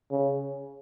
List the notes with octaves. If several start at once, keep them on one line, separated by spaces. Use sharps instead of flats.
C#3